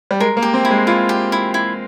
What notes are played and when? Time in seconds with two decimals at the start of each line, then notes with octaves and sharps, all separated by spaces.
0.11 G3
0.20 G#3 A#4
0.37 A#3
0.42 G4
0.54 C4
0.65 E4
0.71 G#3
0.87 E4 F4
1.09 G4
1.32 E4
1.54 E4